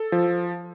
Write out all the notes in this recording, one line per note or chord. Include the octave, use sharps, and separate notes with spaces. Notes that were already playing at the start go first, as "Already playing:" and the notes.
Already playing: A4
F3